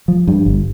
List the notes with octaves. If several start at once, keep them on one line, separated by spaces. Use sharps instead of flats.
F3
G2
G1